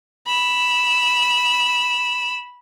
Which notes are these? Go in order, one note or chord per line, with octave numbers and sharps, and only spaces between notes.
B5 E7